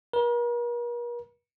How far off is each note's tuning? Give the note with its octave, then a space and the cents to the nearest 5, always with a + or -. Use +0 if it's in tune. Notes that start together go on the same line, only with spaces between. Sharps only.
A#4 +45